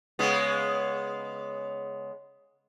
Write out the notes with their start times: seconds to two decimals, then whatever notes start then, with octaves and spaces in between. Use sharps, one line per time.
0.19 C#3 G#3 B3